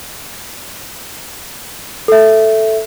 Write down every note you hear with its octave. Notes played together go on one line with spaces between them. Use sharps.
A4 E5